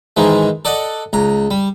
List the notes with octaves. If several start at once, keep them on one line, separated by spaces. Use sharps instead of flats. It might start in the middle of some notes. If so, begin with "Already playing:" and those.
G#2 D#3 E3 G#3
A4 D5 D#5 F#5
C#2 A#5
G3